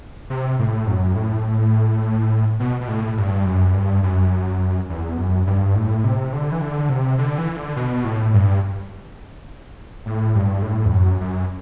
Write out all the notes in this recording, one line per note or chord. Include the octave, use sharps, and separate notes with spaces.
C3
A2
F#2
A2
B2
B2
A2
G2
F#2
G2
F#2
E2
F#2
G2
A2
C3
D3
E3
D3
C3
D3
E3
D3
B2
A2
G2
A2
G2
A2
E2
F#2
F#2